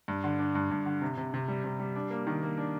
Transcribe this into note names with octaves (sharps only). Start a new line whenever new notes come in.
G2
D3
D4
G2
G2
D3
C3
C3
C3
G3
C3
G3
D4
A#3
D#3
A#3
D4